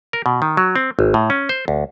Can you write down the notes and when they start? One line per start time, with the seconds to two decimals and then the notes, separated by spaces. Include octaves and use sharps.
0.13 A#4
0.26 B2
0.42 D#3
0.57 F#3
0.76 C4
0.99 G#1
1.14 A2
1.30 C#4
1.49 C5
1.68 D2